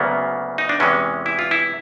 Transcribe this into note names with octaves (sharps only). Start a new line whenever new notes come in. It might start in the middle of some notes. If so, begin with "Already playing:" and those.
Already playing: D2 C#3 F#3 A#3 B3
D#4
D4
E2 C3 E3 G#3 C#4
E4
F4
E4